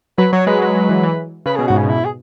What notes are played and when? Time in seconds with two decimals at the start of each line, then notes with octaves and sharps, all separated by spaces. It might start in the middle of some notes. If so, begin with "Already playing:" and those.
0.18 F#3 B4
0.33 F#3 C#5
0.47 G#3 B4
0.62 F#3 B4
0.75 F#3
0.89 E3
1.03 E3
1.46 C#3 B4
1.56 B2 G#4
1.68 G#2 F#4
1.78 C#4
1.83 B2
1.89 E4
2.05 G#4